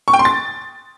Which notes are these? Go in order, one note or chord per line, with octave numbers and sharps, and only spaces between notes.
C#6
G5
C6
A6